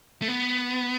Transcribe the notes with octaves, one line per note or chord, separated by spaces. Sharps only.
A3
B3